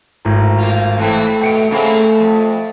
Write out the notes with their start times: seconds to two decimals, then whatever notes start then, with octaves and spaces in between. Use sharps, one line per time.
0.25 G#1 A2 A#5
0.58 A#3 F4
0.98 A2 E3 A3 C4
1.41 B2 G5 C#7 D7
1.71 C#3 A3 A#3 C4
2.20 F2